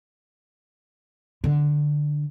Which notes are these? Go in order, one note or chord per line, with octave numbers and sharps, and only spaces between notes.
D3